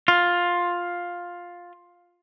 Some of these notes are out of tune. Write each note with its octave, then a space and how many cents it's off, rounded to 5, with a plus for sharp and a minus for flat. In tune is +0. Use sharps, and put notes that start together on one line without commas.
F4 +10